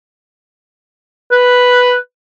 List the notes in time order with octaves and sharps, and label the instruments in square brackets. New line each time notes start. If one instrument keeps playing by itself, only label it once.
[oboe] B4